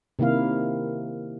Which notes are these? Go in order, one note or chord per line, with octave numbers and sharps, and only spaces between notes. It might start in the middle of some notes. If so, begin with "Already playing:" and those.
C3 D#3 A#3 E4 F5